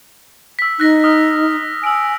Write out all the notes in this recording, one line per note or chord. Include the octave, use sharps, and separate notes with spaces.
E6 B6
D#4 F#6 A#6 B6
D#6 F6
G#5 E6 D7